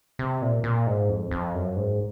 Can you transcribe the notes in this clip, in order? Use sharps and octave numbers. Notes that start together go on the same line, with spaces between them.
C3
A#2
A#2
G#2
F2
F2
F#2
G#2